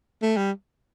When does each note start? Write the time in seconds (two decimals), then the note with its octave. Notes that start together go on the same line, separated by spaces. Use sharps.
0.22 A3
0.37 G3